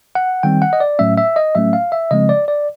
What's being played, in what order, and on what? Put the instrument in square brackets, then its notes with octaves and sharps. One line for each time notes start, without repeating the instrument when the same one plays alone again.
[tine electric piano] F#5
D#3 G3 C4 G5
F#5
D#5
D5
A2 F#3 A3 C#4 E5
E5
D#5
A2 F#3 A3 C#4 E5
F5
E5
C#3 F3 G#3 C4 D#5
D5
D5